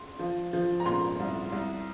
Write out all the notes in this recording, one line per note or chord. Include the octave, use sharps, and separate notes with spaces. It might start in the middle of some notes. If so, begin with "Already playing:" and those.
Already playing: C6
F3
F3
A#5
A#2 C6
C2
C2